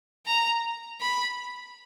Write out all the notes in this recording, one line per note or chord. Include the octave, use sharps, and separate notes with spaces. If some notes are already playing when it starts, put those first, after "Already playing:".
A#5
B5